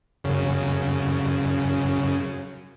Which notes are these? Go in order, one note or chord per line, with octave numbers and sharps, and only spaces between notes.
F#2 C#3